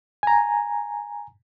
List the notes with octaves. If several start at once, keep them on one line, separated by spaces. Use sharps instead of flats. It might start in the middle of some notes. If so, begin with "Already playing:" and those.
G#5 A#5